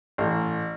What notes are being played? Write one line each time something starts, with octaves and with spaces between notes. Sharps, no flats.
A1